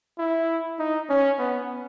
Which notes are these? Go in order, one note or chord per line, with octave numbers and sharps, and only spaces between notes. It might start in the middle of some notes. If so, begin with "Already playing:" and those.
E4
D#4
C#4
B3